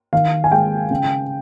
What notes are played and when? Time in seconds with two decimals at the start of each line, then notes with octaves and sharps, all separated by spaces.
0.13 D#3 F5
0.44 G#5
0.52 G#3 G5
0.91 C#3